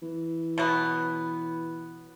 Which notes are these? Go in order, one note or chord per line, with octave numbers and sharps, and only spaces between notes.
E3
B2 F#3 B3